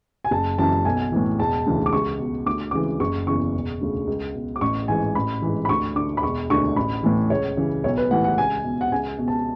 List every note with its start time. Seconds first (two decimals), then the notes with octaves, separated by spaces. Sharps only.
0.25 G#5
0.31 F#1 A5
0.58 F#2 E3 A5
0.85 B1 G#5
1.12 A2 E3
1.38 E1 A5
1.66 D2 C#3 E3
1.86 D6
1.92 C#2 C#6
2.19 B2
2.46 D2 D6
2.71 C#3 E3 D6
3.00 F#1 C#6
3.27 E2 C#3 E3 C#6
3.54 E1
3.81 D2 C#3
4.07 C#2
4.35 B2
4.56 D6
4.61 A1 C#6
4.88 G#2 E3 G#5
5.15 A1 B5
5.42 G#2 E3
5.65 B5
5.69 D2 C#6
5.96 D3 D6
6.17 B5
6.22 E1 C#6
6.50 D2 D3 C#6
6.76 A1 B5
7.03 A2 E3
7.30 C#2 C#5
7.57 C#3 E3
7.84 B1 C#5
7.97 B4
8.11 A2 E3 F#5
8.24 F#5
8.38 C#2 G#5
8.64 B2
8.81 F#5
8.92 C#2 G#5
9.18 B2
9.28 A5